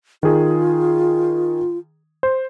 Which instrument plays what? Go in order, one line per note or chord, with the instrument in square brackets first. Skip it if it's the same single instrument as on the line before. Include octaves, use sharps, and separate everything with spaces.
[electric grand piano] D#3 G#4 [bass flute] F4
[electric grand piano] C5